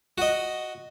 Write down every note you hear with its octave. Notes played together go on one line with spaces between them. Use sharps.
F#4 D#5